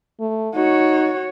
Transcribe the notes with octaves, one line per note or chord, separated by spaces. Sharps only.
A3
D#4 F#4 C#5